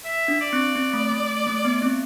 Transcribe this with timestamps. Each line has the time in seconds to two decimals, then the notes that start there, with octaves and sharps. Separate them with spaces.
0.05 E5
0.28 D4
0.41 D5
0.53 C4
0.76 C4
0.93 A3
1.12 A3
1.47 A3
1.65 B3
1.82 C4